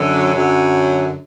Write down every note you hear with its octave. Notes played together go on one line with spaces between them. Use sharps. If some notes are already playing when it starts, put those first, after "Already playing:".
Already playing: F#2 D3 F#3
F#2 D3 F#3